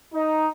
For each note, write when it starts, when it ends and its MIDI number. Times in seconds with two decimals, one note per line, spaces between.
0.13 0.47 63